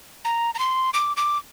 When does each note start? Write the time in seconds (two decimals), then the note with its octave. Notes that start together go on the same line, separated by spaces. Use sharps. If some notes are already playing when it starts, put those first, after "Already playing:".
0.25 A#5
0.55 A#5
0.59 C6
0.94 D6
1.17 D6